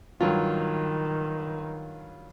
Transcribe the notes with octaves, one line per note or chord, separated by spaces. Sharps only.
G2 D#3 F#3 F4